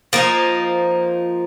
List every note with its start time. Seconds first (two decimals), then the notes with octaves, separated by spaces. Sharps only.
0.13 F3 A#3 D#4